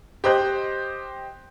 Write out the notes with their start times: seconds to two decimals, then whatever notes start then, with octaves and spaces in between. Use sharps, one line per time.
0.24 G4 C5 D#5 F#6 G6